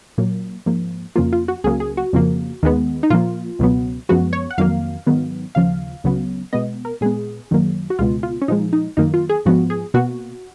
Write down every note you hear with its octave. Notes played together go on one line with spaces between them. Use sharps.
A#2 F#3 A#3
G#2 F3 A#3
F2 C#3 F3 A#3 F4
F4
F#4
C#2 C#3 F#3 A#3 G#4
G#4
F#4
F2 C#3 F3 A#3
D#2 D#3 G#3 B3
D#4
A#2 F3 A#3 F4
C#2 B2 F#3 B3
F#2 F3 G#3 B3 F#4
C#5
F#5
F2 D#3 F#3 A#3 F5
G#2 D#3 F#3 B3
D#2 C#3 F3 F5
C#2 C#3 F#3 B3
B2 G#3 B3 D#5
A#4
A#2 G#3 B3 G#4
F#2 D#3 F#3 A#3
F#4
C#2 B2 G#3 B3 F4
F4
C#4
A#2 F3 G#3 D#4
D#4
F#2 D#3 A#3 D#4
F4
G#4
G#2 F3 B3 F#4
G#4
B2 A#3 F#4